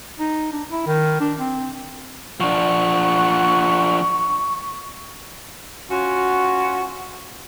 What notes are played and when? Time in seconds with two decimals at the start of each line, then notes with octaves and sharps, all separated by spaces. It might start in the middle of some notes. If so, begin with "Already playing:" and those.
0.19 D#4
0.52 D4
0.69 E4
0.87 D#3
1.20 D4
1.39 C4
2.40 F3 D4 F#5 C#6
5.90 C#4 F4 F#4